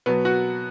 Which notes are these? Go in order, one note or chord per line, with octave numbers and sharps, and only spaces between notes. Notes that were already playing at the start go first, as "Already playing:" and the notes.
B2 F#3 B3
F#4